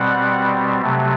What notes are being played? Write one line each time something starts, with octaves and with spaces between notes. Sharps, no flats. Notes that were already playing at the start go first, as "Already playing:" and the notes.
Already playing: B2 G3 C4 F#5
C3 F#3 A3